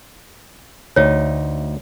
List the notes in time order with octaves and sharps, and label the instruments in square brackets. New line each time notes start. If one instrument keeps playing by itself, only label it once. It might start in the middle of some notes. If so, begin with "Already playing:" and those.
[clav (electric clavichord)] D2 D#4 [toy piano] C#5